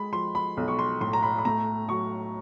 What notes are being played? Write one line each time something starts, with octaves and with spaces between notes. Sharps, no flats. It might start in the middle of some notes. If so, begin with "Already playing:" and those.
Already playing: G#3 B5
F3 C6
B5
B1
C#6
C6
A2 C6
A#5
B5
B5
A3 A#5
F#3 C#6